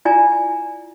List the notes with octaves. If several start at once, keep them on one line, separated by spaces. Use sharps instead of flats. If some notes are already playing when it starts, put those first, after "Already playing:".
E4 F4 D5 G#5 A#5